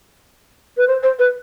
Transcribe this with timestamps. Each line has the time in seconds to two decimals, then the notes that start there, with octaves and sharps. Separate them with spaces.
0.77 B4
0.87 C5
1.03 C5
1.19 B4